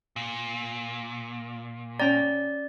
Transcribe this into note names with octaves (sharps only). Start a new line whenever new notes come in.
A#2
C#4 D5 G5 A#5